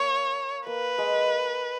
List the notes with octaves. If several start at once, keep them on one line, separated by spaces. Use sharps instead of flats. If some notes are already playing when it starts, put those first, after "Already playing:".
Already playing: A#3 C#5
A#3 B4
G#3